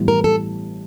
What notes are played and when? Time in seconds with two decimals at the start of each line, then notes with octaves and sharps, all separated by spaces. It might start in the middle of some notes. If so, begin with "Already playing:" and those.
Already playing: A1 A2 E3 G3 B3
0.08 A#4
0.24 A4